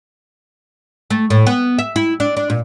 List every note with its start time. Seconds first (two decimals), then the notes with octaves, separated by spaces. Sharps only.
1.10 A3
1.30 A2
1.47 B3
1.79 E5
1.96 E4
2.20 D4
2.37 D4
2.50 A#2